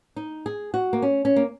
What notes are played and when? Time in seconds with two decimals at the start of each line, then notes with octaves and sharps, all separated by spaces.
0.16 D#4
0.46 G#4
0.74 F#4
0.93 A#3
1.02 C#4
1.25 C#4
1.36 A#3